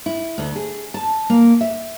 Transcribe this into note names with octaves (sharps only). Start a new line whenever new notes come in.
E4
D2
G#4
A5
A#3
E5